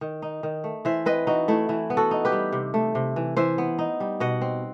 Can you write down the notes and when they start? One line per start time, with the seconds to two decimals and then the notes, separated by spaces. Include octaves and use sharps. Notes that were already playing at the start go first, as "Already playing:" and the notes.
0.01 D#3
0.22 D#4
0.43 D#3
0.64 A3
0.85 E3 C5 E5
1.06 C4 B4 D#5
1.27 E3 D#4 F#4
1.48 A3 E4
1.69 E3 E4
1.90 B3
1.97 F#4 A4
2.11 D#4
2.25 G4 B4
2.32 G3
2.52 C3
2.74 A3
2.95 C3
3.16 E3
3.37 E3 C5 E5
3.58 B3
3.79 D#4
4.00 G3
4.20 B2 D#5 F#5
4.41 C4